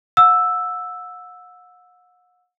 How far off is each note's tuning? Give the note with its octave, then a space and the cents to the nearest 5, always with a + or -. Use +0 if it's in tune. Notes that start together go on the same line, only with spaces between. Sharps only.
F#5 -40 E6 +0